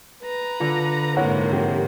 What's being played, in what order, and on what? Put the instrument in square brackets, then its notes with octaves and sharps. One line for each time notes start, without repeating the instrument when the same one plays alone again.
[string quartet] B4 A#5
[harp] D3 [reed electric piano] F4
[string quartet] G#2 C3 A#3 [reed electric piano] E4 C#5 F#5
[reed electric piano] F3 C4 G4